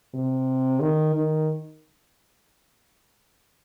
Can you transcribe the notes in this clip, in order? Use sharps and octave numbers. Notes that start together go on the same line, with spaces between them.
C3
D#3
D#3